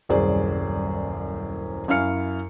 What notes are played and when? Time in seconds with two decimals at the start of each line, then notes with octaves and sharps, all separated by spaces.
0.09 D#1 C2 F#2 G#4 C5 D5
1.88 F#2 C#4 E4 F5 F6 C#7